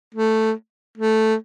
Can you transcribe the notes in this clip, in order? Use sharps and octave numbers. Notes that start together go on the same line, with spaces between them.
A3
A3